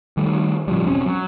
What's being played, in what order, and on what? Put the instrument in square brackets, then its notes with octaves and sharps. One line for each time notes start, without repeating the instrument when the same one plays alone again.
[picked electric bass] D#3 G3 A3
A2 C#3 F3 G3
E1 C4 C#4
F#3